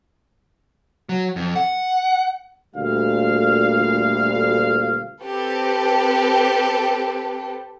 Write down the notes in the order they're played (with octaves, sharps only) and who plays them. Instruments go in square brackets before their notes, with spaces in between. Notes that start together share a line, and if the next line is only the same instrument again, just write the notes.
[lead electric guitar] F#3
F2
F#5
[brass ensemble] D2 A#2 G3 F5
[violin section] C4 G4 A4 B4